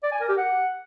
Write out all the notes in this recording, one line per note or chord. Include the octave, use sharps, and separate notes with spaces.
D5
G#5
A#4
G4
F#5